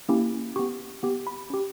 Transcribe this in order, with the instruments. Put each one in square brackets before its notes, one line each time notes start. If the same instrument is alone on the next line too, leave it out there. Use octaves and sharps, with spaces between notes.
[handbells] A#3 C#4 E4 G4
B3 G4 C#6
B3 G4
B5
C#4 G4